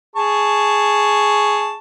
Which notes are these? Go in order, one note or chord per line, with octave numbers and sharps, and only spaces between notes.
G#4 A5 C#6